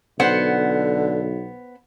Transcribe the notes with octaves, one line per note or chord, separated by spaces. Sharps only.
B1 D3 B3 C5 F#5